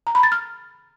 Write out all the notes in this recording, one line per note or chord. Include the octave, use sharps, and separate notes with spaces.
A#5
B5
A6
F6